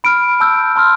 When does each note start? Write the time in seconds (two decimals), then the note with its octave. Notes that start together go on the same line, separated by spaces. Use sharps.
0.04 B5 F6 D7
0.40 A5 E6 G6
0.76 A5 C6 F6